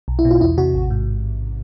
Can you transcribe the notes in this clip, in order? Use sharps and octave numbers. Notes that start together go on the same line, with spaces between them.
B1
E4
B2
F4
E2 E4
C3 F#4
A1
G#2